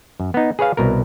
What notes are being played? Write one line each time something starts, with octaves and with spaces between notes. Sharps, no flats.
F#2
B3 D#4
G#4 B4 C#5 F5
C2 B2 A#4